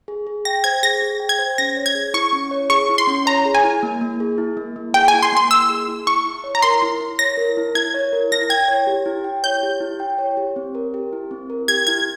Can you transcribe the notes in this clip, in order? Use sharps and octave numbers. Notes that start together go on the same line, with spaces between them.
G#4
G#4
G5 A#6
C5 G#6
G#4 A#6
G#4
G5
G#6
C5
C#4 A#6
C#5
G#6
G#4
E4 C#6
C#4
C#5
G#4 C#6
E4
C6
C#4
C#5 A#5
G#4
G#5
E4
A#3
A#3
G#4
E4
A#3
A#3
G#4 G5
G#5
E4
C6
A#3 C6
A#3 E6
G#4
E4
E4 C#6
E4
C#5
A#5
A#4 C6
E4
E4
C#5 A#6
A#4
E4
E4 G#6
C#5
A#4
E4 A#6
G5 G#6
C#5
G4
E4
G5
C#5 G6
G4
E4
G5
C#5
G4
C4
A#4
G4
E4
C4
A#4
G4 G#6
E4 G#6